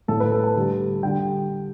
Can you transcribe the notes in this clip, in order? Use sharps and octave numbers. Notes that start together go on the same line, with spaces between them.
A2 A3 A4
B4
A4
A5
D3 G3
D3 G3 G5